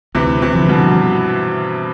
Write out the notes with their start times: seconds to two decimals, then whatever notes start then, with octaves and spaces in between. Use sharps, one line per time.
0.15 D2 C3 E3
0.42 C3 E3
0.55 D3 F3
0.68 G2 B2